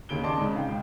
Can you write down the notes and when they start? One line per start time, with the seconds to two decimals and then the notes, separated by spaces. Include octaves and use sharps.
0.09 D#2 C#3 D7 G7
0.23 D5 D#5 A5 C6 D6
0.38 G#2 C#3
0.56 F5 G5
0.68 C#2